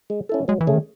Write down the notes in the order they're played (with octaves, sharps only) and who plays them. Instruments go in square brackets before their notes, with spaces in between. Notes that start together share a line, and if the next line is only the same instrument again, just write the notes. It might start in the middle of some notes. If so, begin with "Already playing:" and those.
[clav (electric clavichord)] G#3
C#4 E4 A4
[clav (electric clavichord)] F#3 [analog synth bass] G#3
[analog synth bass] E3
[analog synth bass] C#3 [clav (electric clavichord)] A3 C#4 G#4
[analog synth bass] D#3